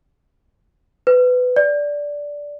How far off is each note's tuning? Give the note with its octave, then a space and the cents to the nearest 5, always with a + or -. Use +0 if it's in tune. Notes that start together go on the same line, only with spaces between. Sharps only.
B4 +20
D5 -10